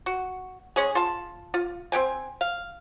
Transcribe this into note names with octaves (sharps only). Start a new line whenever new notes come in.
F#4
G#3 C#4 G#4
F4 A5
F4
C4 G4 G5 G#5
F5